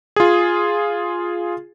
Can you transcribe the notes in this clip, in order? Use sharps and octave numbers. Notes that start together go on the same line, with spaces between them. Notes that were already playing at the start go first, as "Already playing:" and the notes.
F4 G#4